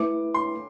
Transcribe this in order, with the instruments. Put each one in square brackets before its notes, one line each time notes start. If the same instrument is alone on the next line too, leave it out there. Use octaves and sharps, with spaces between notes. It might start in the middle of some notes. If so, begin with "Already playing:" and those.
Already playing: [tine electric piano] A3 E4 B4 E5 [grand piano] D6
[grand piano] C6